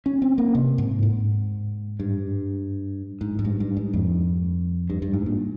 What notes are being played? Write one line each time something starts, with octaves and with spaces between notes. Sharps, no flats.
C#4
C4
A#3
C3
G#2
G#2
G2
G#2
G#2
G2
G2
G#2
F2
G2
G2
G#2
A#2